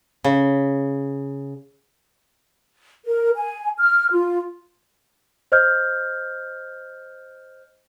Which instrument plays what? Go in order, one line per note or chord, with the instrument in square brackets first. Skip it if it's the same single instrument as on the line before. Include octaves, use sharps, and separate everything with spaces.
[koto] C#3
[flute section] A#4
G#5
F6
F4
[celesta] C5 D#5 F6 G6